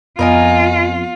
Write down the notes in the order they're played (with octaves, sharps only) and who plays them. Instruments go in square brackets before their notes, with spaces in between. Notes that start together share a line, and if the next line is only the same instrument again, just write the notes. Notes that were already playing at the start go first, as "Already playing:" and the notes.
[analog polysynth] F2 [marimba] B3 [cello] F4 [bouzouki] A#4 D#5 G#5